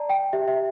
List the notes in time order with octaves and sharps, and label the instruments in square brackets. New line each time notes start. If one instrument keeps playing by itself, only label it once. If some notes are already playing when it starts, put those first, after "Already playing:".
Already playing: [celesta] D5 A5 A#5
G5
G4 E5
E5